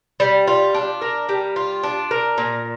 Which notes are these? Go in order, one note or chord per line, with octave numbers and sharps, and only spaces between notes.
G3
F4
D4
A#4
G3
F4
D4
A#4
A#2